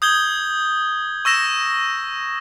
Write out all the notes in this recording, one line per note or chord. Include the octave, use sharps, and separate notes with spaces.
D#6 G6 G#6 G7
C#6 E6 A#6 E7